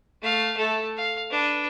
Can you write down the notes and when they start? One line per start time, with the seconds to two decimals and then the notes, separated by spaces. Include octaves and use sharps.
0.22 A3 F5
0.57 A3 A4
0.97 F5
1.31 D4 B4